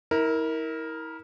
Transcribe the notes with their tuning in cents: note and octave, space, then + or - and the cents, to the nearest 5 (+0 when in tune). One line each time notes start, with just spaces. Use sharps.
E4 -35 A#4 +0